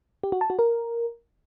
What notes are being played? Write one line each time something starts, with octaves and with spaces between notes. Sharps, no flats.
G4
F#4
A5
F#4
A#4